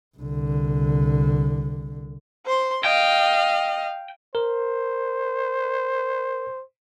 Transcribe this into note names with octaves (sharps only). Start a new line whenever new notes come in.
C2 D3
C5 C6
D#5 F5 G5
A#4 C5